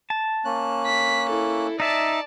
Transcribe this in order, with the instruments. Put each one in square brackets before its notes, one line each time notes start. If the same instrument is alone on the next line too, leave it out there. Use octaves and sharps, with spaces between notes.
[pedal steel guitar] A5
[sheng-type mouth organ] A#3 C#4 F#6
[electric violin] B6
E4 A4
[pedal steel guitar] D#4 E5 [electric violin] D5 A5